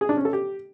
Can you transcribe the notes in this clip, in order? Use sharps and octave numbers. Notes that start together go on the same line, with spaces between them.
G#4
D4
C#4
A4
G4